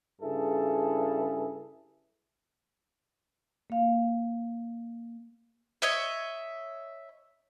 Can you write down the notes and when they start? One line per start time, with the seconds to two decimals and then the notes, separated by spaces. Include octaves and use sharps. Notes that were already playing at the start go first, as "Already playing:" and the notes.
0.21 G2 C#3 E4 G#4 A4
3.70 A#3 F5
5.82 C#5 D#5 E5